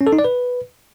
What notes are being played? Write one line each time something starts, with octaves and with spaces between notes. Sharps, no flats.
C#4
A4
D#4
D5
B4